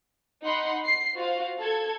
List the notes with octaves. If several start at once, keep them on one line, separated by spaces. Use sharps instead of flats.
D#4 F#5 B5 C6
C7
F4 F#4 C5 F5
A4 G#6